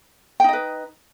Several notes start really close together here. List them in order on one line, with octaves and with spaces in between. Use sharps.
G5 D#4 D#5 B4